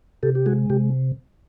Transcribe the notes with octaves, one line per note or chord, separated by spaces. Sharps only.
C3 G4 A4
G4
G#3 F#4 G#4
C3 G4